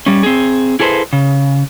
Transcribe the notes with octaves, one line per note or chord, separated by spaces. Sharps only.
G3 C#4
C4 G#4
E4 G#4 A4 B4 C5
C#3